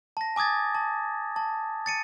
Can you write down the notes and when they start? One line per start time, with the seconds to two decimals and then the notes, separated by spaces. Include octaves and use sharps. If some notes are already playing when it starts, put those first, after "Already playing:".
0.17 A5 A#6
0.36 G#5 D6 D#6 G#6 A6
0.75 A5
1.36 A5
1.86 A6 C#7 D#7